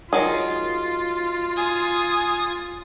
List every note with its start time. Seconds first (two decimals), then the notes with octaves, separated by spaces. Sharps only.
0.13 D#3 F#3 F4 G#4
1.56 G#5 D#6